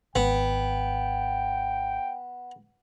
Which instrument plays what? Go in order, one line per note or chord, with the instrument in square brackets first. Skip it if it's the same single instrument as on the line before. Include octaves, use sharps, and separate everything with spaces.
[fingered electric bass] G#1 [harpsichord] B3 [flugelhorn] G5